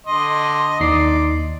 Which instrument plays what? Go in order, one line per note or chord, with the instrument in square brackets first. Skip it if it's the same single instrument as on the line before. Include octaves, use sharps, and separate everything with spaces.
[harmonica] D3 D#5 C6
[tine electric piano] D#2 D#4 C7 [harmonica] D5